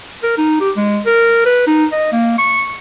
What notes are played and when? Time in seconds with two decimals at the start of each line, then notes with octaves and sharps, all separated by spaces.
0.23 A#4
0.38 D#4
0.61 G4
0.76 G#3
1.06 A#4
1.46 B4
1.67 D#4
1.92 D#5
2.12 A#3
2.38 C#6